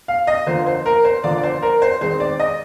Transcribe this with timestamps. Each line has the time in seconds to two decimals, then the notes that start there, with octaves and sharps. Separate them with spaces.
0.08 F5
0.27 D#5
0.46 D3 F3 A#3 C5
0.66 C5
0.86 A#4
1.05 C5
1.24 D3 F3 A#3 D5
1.38 D5
1.43 C5
1.62 A#4
1.82 C5
2.01 D#3 G#3 C4 C5
2.20 D5
2.39 D#5